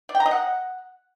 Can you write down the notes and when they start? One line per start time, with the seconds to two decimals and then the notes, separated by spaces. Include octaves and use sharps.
0.09 D5
0.15 G5
0.20 A#5
0.26 D#5
0.31 F#5